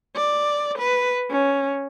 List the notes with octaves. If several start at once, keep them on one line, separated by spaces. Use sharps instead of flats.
D5
B4
C#4